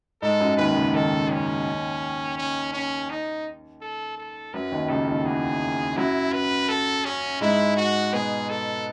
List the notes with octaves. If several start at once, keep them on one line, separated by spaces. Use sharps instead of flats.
G#2 G#3 A4
F#2 F#3
D#2 D#3 B4
C#2 C#3
D#2 D#3 A4
C#4
C#4
C#4
D#4
A4
A4
F#2 F#3 B4
D#2 D#3
C#2 C#3 A4
D#2 D#3
E2 E3 G#4
F#2 F#3 E4
B4
A4
C#4
G#2 G#3 E4
F#4
B2 B3 G#4
A4